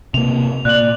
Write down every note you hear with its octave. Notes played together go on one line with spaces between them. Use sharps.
C3 A#3 F7
A#2 D5 F#6 F#7